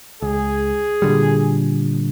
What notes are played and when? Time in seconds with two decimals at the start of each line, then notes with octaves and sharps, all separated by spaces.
0.22 C#2 G#4
1.02 A#2 D3 G3